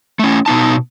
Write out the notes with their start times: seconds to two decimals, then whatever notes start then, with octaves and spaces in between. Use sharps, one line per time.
0.19 A3 C#4
0.46 B2 B3 D#4 A5